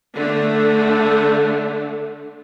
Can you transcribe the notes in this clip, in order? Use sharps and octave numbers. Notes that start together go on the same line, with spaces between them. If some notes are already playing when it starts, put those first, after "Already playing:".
D3 A3